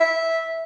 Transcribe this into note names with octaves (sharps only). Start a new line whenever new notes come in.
E5